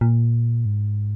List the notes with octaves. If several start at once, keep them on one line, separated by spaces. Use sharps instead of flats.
A#2
G#2